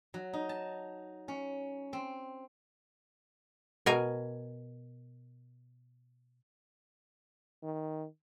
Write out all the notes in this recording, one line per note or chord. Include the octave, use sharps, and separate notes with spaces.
F#3
D#4
A5
C#4
C4
B2 A#4 G#5
D#3